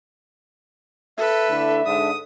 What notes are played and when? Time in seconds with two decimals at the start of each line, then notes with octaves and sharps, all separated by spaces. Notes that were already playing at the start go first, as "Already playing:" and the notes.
1.17 A4 B4 E5
1.49 D3 A3 E4
1.85 G#2 D3 D#6